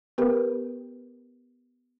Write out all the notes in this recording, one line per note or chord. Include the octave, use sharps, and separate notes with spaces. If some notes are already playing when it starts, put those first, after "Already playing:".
B3 G4 A#4 B4